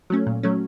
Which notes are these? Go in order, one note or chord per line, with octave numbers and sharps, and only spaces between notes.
F#3 A3 C#4
A#2
F#3 A3 C#4